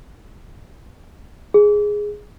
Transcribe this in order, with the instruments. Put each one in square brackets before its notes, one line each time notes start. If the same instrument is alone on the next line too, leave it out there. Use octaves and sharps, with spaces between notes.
[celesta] G#4